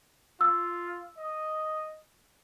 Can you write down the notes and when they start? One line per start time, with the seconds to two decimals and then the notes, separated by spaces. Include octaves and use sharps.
0.41 F4 E6
1.18 D#5